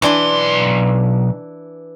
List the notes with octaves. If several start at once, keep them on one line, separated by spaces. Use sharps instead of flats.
B1 E3 D4 B4 C6